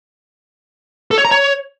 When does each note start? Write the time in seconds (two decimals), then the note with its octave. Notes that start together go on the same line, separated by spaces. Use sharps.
1.11 A4
1.18 C#5
1.25 A#5
1.31 C#5